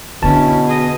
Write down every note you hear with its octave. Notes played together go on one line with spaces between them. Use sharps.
B2 D3 C#4 D4 E4 A5
G#4 D#5